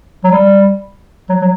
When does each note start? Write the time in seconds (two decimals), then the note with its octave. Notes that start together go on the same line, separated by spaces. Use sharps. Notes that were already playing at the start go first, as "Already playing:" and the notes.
0.24 F#3
0.31 G3
1.29 F#3
1.41 F#3